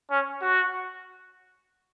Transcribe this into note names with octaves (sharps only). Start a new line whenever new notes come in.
C#4
F#4